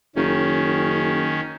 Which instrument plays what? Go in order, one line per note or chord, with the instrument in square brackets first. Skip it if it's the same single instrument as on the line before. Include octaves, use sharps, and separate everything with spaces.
[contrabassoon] F#1 [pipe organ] D#3 C#4